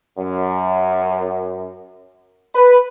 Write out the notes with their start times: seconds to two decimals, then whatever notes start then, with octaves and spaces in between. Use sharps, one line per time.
0.18 F#2
2.55 B4